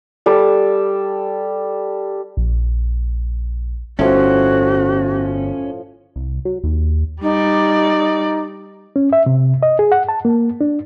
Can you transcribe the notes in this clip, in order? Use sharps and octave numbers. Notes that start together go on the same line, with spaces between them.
G3 A4
A#1
G1 A2 F3 C#4 F#4
C2
F#3
D#2
G3 D#4 D5
C#4
E5
C3
D#5
G#4
F#5
A5
A#3
D4